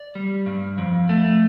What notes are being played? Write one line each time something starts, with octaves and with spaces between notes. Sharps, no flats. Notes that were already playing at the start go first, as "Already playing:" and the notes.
Already playing: D5
G3
G2
F2
A3